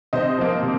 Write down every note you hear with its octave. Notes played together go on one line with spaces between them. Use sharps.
C3 C5 D#5
F3 A#3
C3